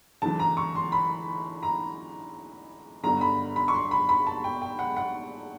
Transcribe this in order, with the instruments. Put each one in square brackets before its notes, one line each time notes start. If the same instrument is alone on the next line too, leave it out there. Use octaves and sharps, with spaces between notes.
[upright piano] D2 C#3 E3 A5
A#5
C#6
C6
B5
A#5
G1 G2 D3 A#5
B5
B5
C#6
C6
B5
B5
A5
G5
G5
F#5
F#5